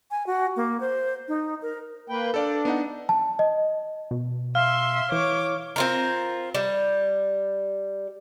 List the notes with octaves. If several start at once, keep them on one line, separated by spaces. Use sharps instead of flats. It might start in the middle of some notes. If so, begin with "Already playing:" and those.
G#5
F#4
A#3
C5
D#4
A#4
A#3 B4 G5
D4 A4 D5 F5
B3 D#4 F#5
A5
D#5
B2
E5 F5 C6 F6
E3 C#5 D6
C4 F4 A#4
G3